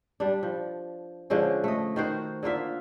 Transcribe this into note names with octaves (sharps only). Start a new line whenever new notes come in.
G3 D4
F3
D3 F3 G#3 C#4
A3 D#5
D#3 F#4 C5
D3 A#3 F4 E5